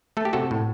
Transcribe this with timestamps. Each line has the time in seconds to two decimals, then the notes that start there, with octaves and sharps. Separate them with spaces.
0.17 A3 A4
0.25 G4
0.33 C3 F#4 A4
0.51 A2